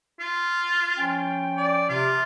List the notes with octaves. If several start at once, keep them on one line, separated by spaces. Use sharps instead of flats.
F4
F3 C#4 G5
D5
C3 F4